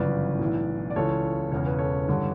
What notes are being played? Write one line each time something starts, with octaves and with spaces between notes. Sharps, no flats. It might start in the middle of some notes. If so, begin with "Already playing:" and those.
Already playing: G1 F#2 C#3 E3 B4 D5
B1 A2 E3
D5
C#2 C#3 E3 A4 C#5
E1 E2 C#3 C#5
B4
A4 C#5
A1 G2 D3